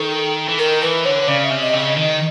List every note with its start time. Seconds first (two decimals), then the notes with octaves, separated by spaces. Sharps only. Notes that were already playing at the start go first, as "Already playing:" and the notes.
Already playing: D#3 A4
0.48 E3
0.59 D#3 A#4
0.82 E3 B4
1.05 D3 C#5
1.28 C#3 D5
1.44 E5
1.50 C3
1.62 D#5
1.73 C#3
1.79 D#5
1.96 D#3